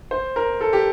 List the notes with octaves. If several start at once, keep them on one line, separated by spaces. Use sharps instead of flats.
C5
A#4
A4
G4